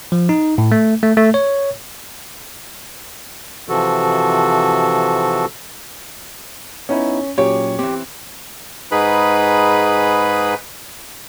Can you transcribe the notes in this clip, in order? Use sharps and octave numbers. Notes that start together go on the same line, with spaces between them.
F3
D#4
A2
A3
A3
A3
C#5
C3 E3 F3 F#4 A4
B3 C#4 D#4 E4
A#2 F#3 C#4 G4 C#5
E3 C4 G4
G#2 D#4 G#4 B4 B5